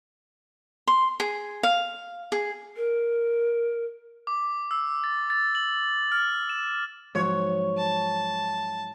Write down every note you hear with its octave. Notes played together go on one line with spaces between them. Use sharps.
C6
G#4
F5
G#4
A#4
D6
E6
A6
A6
F#7
F6
E7
G#2 F3 F#3 C#5
A5